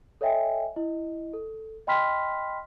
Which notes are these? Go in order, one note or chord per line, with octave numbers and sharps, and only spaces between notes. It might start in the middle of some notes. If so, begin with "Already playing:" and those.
A4 C#5 D#5 E5 G5 G#5
E4 D#5
A4
D#5 G5 B5 C6 F6 B6